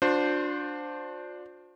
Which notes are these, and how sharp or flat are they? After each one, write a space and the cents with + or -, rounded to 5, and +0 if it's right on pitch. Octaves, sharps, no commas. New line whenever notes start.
D4 +0 F4 +45 C5 -10